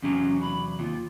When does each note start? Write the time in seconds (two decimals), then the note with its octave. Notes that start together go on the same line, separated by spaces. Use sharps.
0.02 E2 C3 F#3 C#4
0.41 B5
0.79 D#2 F4